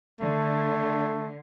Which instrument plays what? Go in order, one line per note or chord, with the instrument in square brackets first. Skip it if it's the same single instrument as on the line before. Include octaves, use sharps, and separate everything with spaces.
[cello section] D3 [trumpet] A3